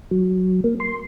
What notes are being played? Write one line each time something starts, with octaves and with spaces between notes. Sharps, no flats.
F#3
A#3
C6